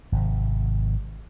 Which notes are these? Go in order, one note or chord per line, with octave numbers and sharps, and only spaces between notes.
G#1 C3